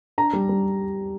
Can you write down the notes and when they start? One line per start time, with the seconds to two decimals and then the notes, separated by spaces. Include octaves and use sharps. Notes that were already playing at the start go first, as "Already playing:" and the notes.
0.18 D4 A#5
0.33 G3
0.49 G3